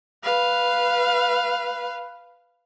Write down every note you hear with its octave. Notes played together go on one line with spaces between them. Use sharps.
B4 F5